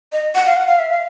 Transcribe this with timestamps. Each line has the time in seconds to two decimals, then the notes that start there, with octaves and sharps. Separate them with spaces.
0.12 D#5
0.35 F#5
0.46 F5
0.56 F#5
0.68 F5
0.79 E5
0.91 F5